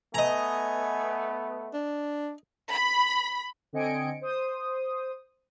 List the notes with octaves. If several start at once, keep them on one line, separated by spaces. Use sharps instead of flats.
A3 B3 D#5 G#5 A#5
D4
B5
D3 C4 D#5 G#5 C#7 D7
C5 D#6